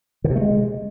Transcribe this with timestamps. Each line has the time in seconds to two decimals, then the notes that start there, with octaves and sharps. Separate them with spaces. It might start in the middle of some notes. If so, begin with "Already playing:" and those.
0.24 D3
0.30 C3
0.36 A3
0.41 G#3